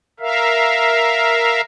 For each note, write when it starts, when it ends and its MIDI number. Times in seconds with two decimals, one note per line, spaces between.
0.20 1.61 70
0.20 1.61 76
0.20 1.61 77